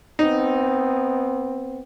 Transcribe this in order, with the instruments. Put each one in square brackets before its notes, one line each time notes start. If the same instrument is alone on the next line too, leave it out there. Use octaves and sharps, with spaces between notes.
[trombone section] B3 C4 [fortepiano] D#4